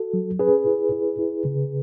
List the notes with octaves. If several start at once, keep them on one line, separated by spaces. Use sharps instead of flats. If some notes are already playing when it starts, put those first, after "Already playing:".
Already playing: F#4 A4
F#3
C#4 G#4 B4
E4
E4
E4
C#3